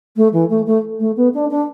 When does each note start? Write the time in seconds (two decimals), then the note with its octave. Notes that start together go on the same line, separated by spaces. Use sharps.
0.16 A3
0.33 E3
0.50 A3
0.66 A3
1.00 A3
1.16 B3
1.34 D4
1.50 D4